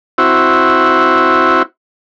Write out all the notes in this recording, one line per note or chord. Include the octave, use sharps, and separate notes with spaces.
C4 E4 F#4